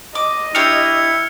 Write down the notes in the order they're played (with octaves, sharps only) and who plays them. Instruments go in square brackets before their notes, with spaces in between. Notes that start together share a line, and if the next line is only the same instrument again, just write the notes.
[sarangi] D#5 [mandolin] D6
[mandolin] D4 G4 C#5 [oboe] E4 [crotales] F6 C#7 F7